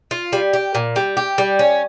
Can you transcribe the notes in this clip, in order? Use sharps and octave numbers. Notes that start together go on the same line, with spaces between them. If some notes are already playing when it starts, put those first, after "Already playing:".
F4
G3
G4
A#2
G3
G4
G3
C#4